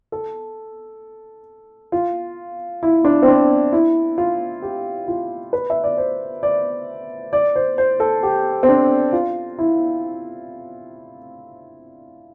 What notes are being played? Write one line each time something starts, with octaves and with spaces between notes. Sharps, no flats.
A4
F4
E4
D4
C4
D4
E4
F4
G4
F4
B4
E5
D5
C5
D5
D5
C5
C5
A4
G4
C4
D4
F4
E4